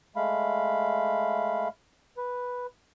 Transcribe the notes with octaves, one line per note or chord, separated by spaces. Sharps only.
G#3 A3 F5 B5
B4